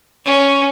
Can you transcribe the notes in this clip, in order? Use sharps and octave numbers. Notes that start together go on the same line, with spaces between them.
C#4